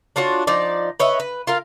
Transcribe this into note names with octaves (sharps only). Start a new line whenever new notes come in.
D4 F4 F#4 C#5
F3 D#4 D5
B4 C#5 D#5 E5
B4
F4 A#4 F5